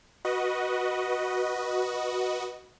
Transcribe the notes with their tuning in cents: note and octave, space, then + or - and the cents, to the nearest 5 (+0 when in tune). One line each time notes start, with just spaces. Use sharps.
F#4 +0 B4 -15 D#5 +0